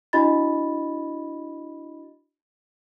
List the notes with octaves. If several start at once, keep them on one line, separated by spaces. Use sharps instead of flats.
D4 E4 F#4 D#5 B5 A6